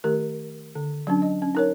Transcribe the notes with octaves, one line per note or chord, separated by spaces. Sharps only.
D#3 A3 G4 A#4
D3
F#3 C#4 D4
D#5
C#4
D#4 A#4 C#5